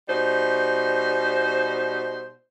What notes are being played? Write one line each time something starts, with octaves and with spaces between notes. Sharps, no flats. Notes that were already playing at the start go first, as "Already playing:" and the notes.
B2 G3 D#4 C5